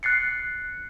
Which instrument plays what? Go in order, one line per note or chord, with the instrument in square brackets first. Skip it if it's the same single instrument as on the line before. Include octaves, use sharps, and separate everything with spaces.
[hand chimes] F#6 A6 C7 C#7